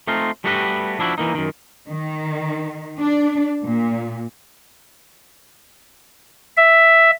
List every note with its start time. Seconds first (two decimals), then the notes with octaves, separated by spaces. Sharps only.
0.07 A3 C4 D#4 F4
0.44 G3 A3 B3 F#4 G4 B4
0.99 F3 D4 E4 F#4
1.18 E3 A#3 D#4
1.35 F#2 D#3
1.89 D#3
3.00 D4
3.64 A#2
6.57 E5